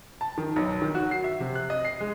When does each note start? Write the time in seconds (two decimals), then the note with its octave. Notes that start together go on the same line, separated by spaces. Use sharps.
0.21 A5
0.38 D#3
0.56 B1
0.82 D#3
0.95 F#4
1.11 C7
1.24 E5
1.40 C3
1.55 F#6
1.70 D#5
1.85 C7
2.00 G#3